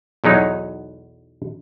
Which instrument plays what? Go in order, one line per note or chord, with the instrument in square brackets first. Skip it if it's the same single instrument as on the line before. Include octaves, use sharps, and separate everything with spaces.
[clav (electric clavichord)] B1 E2 F#3 D#4 C#5